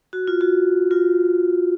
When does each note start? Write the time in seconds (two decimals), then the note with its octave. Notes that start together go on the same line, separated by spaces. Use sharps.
0.13 F#4
0.27 F4
0.41 F#4
0.91 F4